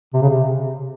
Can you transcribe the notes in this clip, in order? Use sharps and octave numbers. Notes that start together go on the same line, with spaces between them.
C3
C#3
C3